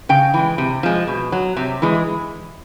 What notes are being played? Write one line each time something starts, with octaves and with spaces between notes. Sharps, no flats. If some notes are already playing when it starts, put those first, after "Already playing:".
C#3 G5
E3 G#3
C3
F3 G#3
B2
F#3
C3
E3 G#3